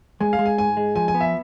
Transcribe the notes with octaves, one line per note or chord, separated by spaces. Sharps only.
G#3 G#5
F5
G#3
G#5
G#2 G#5
G#3
F3 G#5
G#5
B3
E5